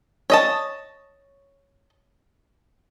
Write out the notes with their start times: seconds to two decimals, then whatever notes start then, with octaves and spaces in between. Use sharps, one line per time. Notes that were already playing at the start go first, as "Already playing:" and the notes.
0.30 C#5 D#5 A5